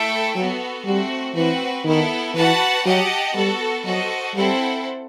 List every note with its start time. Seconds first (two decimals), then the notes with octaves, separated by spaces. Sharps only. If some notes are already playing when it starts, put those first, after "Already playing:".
Already playing: A3 E4 A4 E5 G5
0.35 F#3 B3 F#4 A4
0.86 G3 A3 C4 F#4
1.35 E3 C4 F#4 B4
1.85 D#3 B3 E4 A4
2.35 E3 F#4 B4 F#5 A5
2.85 F#3 G4 D#5 F#5 A5
3.34 G3 B3 F#4 A4
3.85 F#3 F#4 A4 C5 D#5
4.34 G3 C4 E4 A4 C5 F#5